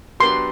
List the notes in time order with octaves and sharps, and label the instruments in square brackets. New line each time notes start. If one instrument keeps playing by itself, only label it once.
[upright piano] F#3 B3 D4 G4 [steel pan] C6